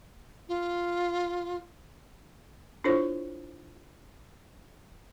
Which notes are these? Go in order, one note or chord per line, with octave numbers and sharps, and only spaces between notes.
F4
D4 E4 F4 A4 C5 C#5